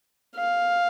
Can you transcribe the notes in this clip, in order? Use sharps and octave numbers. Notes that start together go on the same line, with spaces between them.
F5